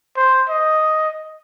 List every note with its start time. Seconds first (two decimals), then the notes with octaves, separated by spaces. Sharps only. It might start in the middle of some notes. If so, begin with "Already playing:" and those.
0.16 C5
0.49 D#5